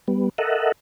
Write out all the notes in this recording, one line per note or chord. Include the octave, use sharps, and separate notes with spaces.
G3 B3
A4 A#4 D#5 E5 F#5